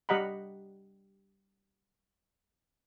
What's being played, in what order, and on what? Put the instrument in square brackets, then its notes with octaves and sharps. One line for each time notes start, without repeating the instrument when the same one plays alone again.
[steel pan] G3 G4 D#5 F#5 A#5 B5